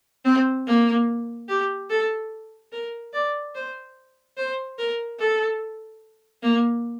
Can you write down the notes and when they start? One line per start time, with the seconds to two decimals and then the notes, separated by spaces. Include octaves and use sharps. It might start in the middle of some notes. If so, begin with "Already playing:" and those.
0.25 C4
0.66 A#3
1.49 G4
1.90 A4
2.72 A#4
3.14 D5
3.55 C5
4.37 C5
4.78 A#4
5.19 A4
6.43 A#3